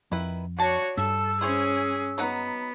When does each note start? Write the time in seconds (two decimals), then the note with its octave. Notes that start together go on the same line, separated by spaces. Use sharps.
0.12 F2 D#3 E4 B4
0.59 D4 F#4 C#5 A5
0.97 G2 A4 E6
1.41 C#4 E4 G#4 C5 C#5
2.18 F#3 B3 D#4 F#5